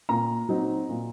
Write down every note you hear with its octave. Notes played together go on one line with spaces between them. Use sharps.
A#2 A#5
F#3 C4 D#4
A#2